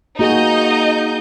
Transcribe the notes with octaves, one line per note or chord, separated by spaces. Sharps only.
A#3 D#4 F#4 G#4 D#5 G6